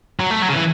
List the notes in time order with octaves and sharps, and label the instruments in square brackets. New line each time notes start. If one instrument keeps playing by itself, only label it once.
[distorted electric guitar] F#3
A3
F#3
C#3
E3